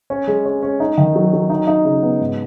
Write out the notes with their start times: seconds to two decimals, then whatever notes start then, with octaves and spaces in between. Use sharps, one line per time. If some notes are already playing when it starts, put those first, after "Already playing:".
0.10 C#4
0.27 G#3
0.46 C#4
0.62 C#4
0.80 D#4
0.98 D#3
1.15 F#3
1.33 F#3
1.50 D#4
1.67 D#4
1.85 C#3
2.02 B3
2.20 G#2